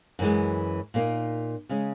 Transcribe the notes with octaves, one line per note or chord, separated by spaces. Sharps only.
F#2 E3 G#3
A#2 A#3 D#4
C#3 G#3 C#4